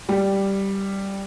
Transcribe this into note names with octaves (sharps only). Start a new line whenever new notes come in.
G3